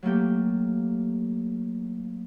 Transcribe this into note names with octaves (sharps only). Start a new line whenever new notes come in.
F#3 A3 A#3 G4